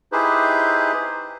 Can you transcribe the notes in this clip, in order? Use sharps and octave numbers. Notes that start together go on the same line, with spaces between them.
D#4 E4 G4 G#4 B4 C5